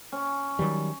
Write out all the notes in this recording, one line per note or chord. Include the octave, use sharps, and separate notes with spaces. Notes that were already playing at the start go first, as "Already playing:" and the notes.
C#4
D#3 F#3 G3